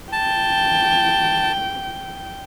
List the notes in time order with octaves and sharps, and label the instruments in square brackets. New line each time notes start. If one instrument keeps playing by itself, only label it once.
[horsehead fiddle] G5 [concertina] A5